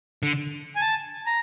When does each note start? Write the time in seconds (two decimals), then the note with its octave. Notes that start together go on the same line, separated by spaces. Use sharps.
0.23 D3
0.76 G#5
0.81 A5
1.26 A#5